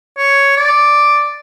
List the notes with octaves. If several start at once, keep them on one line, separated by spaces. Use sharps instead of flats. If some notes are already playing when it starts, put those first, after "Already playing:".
C#5
D5